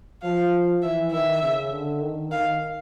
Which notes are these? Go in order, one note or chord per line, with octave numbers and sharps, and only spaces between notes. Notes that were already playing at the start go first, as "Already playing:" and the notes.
F3 F5
E3 E5
D#3 E5
C#3
D3
D#3
D#3 F5